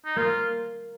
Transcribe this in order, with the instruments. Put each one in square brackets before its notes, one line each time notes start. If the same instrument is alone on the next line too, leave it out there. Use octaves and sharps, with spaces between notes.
[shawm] D#4
[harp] A#3 [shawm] F4